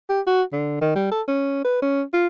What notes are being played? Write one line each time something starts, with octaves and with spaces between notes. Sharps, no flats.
G4
F#4
D3
D#3
G3
A4
C#4
B4
C#4
F4